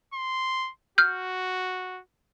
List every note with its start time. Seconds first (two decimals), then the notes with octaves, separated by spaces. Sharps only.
0.14 C6
0.98 F#4 F6 G6